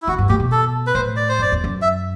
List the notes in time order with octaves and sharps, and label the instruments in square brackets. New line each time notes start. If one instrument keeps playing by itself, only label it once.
[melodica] E4
[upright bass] D3 [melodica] F#4
[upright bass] G2
[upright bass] A2 [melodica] G4
[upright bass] B2
[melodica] A4
B4
[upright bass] A2 [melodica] C5
[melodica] D5
C5
[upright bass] F#2 [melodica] D5
[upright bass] E2
F#2
[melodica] E5